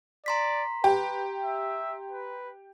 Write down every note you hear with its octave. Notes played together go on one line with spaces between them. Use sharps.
D5 A#5 C6 B6
G4 B4 G5
E5
B4